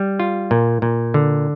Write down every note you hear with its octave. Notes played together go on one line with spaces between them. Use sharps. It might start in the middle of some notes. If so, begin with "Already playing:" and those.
Already playing: G3
F4
A#2
A#2
D3